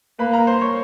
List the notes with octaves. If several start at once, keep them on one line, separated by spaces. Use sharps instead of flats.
A#3 B4 B5
A#4 A#5
C5 C6
C#5 C#6